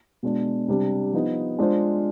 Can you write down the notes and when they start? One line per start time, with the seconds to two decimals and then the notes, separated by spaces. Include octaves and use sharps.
0.23 B2 G#3 D4
0.68 C3 G3 D4
1.13 F3 B3 D#4
1.59 G#3 D4 F4 C5